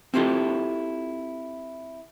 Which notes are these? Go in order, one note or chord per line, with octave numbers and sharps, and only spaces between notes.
C4 E4 F4 G4 A4